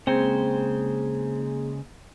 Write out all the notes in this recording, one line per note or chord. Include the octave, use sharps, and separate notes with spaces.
C#3 G#3 A#3 C4 G#4 C5